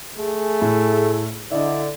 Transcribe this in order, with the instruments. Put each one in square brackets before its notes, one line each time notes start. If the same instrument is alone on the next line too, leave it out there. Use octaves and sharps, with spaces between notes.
[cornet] A3 [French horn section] G#4
[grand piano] A2
[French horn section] D3 [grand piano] E4 D#5 [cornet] D5